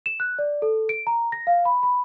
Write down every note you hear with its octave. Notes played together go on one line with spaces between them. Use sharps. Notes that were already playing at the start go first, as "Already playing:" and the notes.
E7
F#6
D5
A4
D7
A#5
A#6
F5
B5
B5